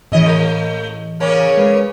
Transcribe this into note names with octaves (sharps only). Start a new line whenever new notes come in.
A2 C#3 E3 D#5
A3
C#3 A#3 C#4
G#3 B4